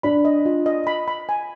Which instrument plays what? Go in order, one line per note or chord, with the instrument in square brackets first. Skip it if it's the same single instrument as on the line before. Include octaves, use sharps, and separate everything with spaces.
[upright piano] D4 [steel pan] B5
[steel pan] D#5
F4
D#5
B5
B5
G#5